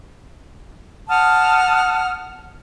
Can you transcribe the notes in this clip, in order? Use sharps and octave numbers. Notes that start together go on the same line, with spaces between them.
F#5 A5 D#6 F6